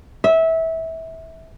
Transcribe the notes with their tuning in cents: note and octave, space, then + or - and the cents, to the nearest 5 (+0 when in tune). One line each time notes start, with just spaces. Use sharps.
E5 -20